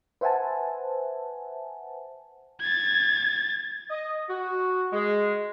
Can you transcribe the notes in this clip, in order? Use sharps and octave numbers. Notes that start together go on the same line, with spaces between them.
B4 C5 E5 F#5 G#5 A5
G#6 A6
D#5
F#4
G#3